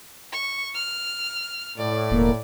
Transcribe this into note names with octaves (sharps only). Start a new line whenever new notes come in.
C#6
F6
A2 D5
E1 A#3